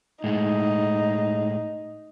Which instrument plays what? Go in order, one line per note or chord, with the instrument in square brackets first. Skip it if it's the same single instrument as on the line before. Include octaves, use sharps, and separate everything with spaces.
[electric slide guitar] A2 G#3 [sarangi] D#4